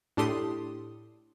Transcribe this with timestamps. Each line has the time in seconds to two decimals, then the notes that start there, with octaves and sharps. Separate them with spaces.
0.17 A2 D4 G4 A4 C6 D#6